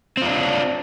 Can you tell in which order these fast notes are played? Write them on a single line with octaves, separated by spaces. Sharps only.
C4 F4 D4